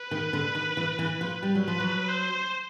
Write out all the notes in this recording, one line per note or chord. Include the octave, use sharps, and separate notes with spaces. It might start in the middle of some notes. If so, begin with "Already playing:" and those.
Already playing: B4
D#3
D3
D#3
E3
E3
F3
G3
F#3
F3 B4
F#3
C5